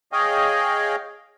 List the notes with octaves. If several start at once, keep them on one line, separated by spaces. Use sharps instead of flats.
G#4 C#5 D#5 F5 G5 G#5